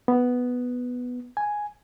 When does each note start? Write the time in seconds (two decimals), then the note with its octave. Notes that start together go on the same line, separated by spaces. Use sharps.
0.08 B3
1.37 G#5